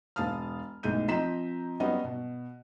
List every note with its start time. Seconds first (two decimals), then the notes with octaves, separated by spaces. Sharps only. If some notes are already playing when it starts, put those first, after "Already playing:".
0.16 E1 F5 A5 D#6 F6
0.83 B1 A2 G#3 G6 D#7
1.08 F3 C4 D#5 A#5 B6 E7
1.80 F#3 G3 B3 C#4 D#5
2.04 B2